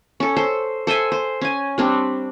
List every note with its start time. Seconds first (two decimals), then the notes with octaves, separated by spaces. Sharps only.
0.20 C#4 A4
0.36 A4 C5
0.87 A4 C5 E5 G#5
1.12 C5
1.41 C#4 G#5
1.78 G3 C4 D4